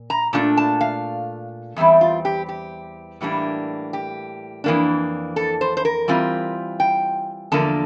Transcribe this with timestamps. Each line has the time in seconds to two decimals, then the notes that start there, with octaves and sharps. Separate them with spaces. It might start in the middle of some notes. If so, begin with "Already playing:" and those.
Already playing: A#2
0.10 A#5
0.33 A#2 A3 D4 F4 A5
0.57 A5
0.81 F5
1.76 E2 E3 G3 C4 E5
2.01 F4
2.25 G4
2.49 G4
3.21 A2 E3 G3 A#3 D4
3.93 G4
4.64 F2 E3 A#3 D4
5.36 A4
5.61 C5
5.77 C5
5.85 A#4
6.08 E3 G3 C4 F4
6.80 G5
7.52 E2 D3 F3 A#3 A5